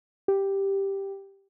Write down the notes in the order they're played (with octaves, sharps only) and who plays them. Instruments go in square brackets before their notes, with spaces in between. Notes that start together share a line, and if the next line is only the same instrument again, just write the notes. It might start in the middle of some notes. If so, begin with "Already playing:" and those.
[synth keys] G4